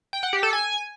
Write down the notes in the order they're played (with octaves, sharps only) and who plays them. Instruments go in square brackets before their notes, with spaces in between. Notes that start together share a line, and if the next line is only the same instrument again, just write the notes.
[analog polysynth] G5
F#5
G4
A4
G#5